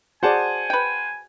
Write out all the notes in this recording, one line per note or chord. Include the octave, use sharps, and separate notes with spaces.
F#4 G#4 C5 D5 F#5 G#5 A5
B4 G5